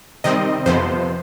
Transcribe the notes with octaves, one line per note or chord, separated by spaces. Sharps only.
C3 D#3 G3 C4 D#5
F2 C3 F3 B3 C5